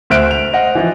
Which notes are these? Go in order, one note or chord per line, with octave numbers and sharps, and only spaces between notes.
D2 C5 E5 F6 F#6 D7
F7
C5 D#5 F#5
E3 F3